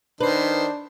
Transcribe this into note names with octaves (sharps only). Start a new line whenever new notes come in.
D#3 D4 B4 C5